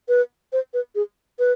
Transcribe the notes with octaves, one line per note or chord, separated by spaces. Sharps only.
B4
C5
B4
G#4
B4